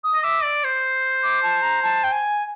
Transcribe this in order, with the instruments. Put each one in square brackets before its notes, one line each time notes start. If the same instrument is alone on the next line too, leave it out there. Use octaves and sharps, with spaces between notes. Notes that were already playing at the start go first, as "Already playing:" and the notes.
[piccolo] D#6
[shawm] D#5
[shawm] E5 [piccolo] D6
[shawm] D5
C5
[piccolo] D6
A5
A#5
A5
G5
G#5